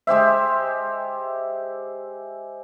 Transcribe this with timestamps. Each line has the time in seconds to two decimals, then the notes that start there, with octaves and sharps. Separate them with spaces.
0.07 G#3 G4 C5 E5